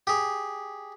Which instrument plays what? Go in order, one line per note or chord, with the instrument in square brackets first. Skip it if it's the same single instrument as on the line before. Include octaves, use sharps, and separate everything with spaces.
[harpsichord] G4 G#4